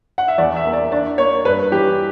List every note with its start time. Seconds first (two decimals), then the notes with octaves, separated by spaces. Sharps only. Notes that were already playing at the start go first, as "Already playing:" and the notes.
0.18 F#5
0.28 E5
0.38 E2 D5
0.57 E5
0.66 A#3
0.73 D5
0.91 D4 D5
1.18 A#3 C#5
1.45 G2 B4
1.72 E3 G4